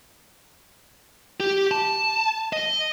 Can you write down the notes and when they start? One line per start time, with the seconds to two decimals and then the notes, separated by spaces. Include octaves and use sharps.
1.40 G4
1.71 A5
2.53 D#5